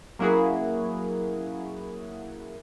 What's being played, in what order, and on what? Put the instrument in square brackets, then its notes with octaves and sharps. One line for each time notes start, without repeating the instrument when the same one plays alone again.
[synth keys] F#3 A#3 C#4 E4 F#4 G#4